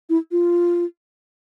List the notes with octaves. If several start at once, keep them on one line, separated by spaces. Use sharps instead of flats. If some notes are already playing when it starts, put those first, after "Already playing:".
E4
F4